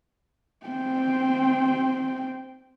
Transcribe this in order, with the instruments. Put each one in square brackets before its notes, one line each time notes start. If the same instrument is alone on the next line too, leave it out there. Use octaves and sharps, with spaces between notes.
[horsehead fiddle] C4 G5